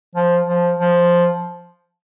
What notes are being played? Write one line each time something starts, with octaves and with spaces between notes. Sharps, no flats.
F3
F3
F3